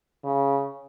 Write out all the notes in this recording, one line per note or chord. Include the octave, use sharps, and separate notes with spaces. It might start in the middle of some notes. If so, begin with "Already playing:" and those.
C#3